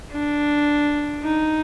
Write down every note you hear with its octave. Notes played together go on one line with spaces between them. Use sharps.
D4
D#4